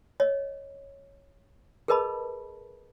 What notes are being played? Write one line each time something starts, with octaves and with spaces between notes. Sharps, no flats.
C#5 D#5
G#4 A#4 B4 D#5 A5 B5